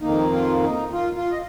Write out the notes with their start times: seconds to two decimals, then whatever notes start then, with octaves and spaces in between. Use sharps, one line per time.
0.01 F2 D#3 A#3 D#4
0.32 F4
0.63 D#4
0.93 F4
1.16 F4
1.32 D#5